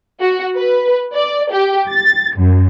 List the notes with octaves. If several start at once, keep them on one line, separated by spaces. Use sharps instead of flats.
F#4
B4
D5
G4
A6
F#2